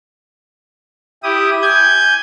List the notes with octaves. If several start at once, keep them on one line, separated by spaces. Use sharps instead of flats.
E4 G4 D#6
G#5 G6 G#6